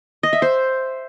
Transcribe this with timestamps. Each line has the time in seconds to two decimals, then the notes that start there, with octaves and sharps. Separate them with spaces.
0.23 D#5
0.33 E5
0.42 C5